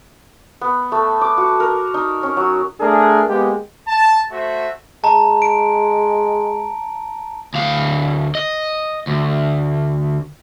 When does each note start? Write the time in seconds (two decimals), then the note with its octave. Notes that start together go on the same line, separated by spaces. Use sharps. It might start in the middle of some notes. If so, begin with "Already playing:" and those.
0.61 B3
0.92 A3
1.21 D6
1.38 F#4
1.60 A#4
1.94 D#4
2.23 C#4
2.37 F#3
2.79 A3 D4 G#4 A#4
3.28 G#3 A#3 B3 G4
3.87 A5
4.31 A3 F#4 C5 E5
5.04 G#3 A5 A#5
5.42 D7
7.54 D2 F5
8.35 D#5
9.07 D2